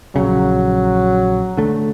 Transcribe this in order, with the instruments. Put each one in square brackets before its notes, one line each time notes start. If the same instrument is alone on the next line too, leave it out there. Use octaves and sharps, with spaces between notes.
[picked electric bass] A#1 C#3 [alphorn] F#3
[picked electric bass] D3 A3